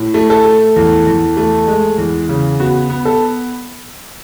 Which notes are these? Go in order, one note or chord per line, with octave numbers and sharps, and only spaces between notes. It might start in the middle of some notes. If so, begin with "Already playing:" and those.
Already playing: A2
A3
A4
A3
E2
E2
A3
G#3
E2
C#3
B3 F#4
B3
A4